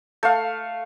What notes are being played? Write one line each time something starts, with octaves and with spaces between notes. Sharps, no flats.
A3 F5